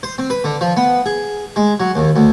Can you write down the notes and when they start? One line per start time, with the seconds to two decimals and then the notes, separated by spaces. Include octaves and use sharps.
0.03 C5
0.18 C4
0.30 B4
0.44 D3
0.61 F3
0.77 B3
1.06 G#4
1.56 G#3
1.80 F#3
1.95 D#2
2.16 D2